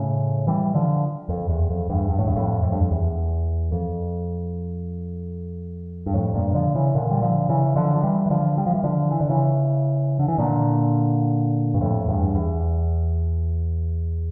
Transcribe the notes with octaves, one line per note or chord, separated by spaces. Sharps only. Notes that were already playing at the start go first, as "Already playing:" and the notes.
Already playing: A2 C#3
E3 G3
D3 F3
F2
E2
F2
E2 G2
G2
A2
E2 G2
F2 A2
F2
G2
F2
E2
F2
G2
F2 A2
G2 A#2
D3 F3
C#3 E3
A#2 D3
G3
D3 F3
C#3 E3
D3 F3
F3
E3 G3
E3
D3 F3
G3
F3
E3 G3
D3 F3
E3
D3
C#3 E3
D3
E3
A#2 D3
G2
F2 A2
E2 G2
E2